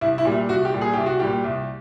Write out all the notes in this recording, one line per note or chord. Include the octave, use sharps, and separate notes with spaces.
C2 E4
E4
A#2 G3
C2 F#4
G4
A#2 G3
G#4
C2 G4
F#4
A#2 G3 G4
C2